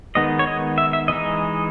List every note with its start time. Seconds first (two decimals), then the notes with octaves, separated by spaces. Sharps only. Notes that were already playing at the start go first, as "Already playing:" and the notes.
0.15 D#3 G#3 B3 D#4 D#5
0.39 C#5
0.47 D#5
0.78 E5
0.93 E5
1.08 E3 G#3 D#4 D#5